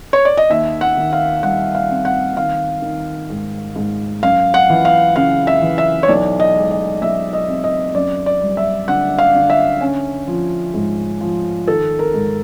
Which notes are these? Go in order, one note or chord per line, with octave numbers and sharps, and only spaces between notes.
C#5
D5
D#5
D#2 E5
F#5
D#3
F5
G3 F#5
F5
C4
F#5
D#3 F5
D#3
G#2
G#2
F#2 F5
F#5
E3
F5
C#3 F5
E5
E3
E5
C#5
B1 D5
D#5
G#3
D#5
B1 E5
D#5
C4
D#5
F#2 D5
D5
G3
E5
D3 F#5
F5
D3
E5
C#4
F3
G#2
F3
D#3 A4
A#4
G#2